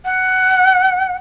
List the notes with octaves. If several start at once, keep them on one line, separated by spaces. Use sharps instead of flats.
F#5